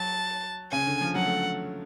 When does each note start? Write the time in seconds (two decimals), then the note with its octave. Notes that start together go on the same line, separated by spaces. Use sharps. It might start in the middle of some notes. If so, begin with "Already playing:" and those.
Already playing: F#3 A5
0.71 C#3 G#5
0.87 D3
1.01 F3
1.15 F#3 F#5
1.26 A3